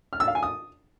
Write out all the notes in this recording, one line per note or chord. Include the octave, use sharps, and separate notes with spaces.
F6
E6
F5
G#5
D#6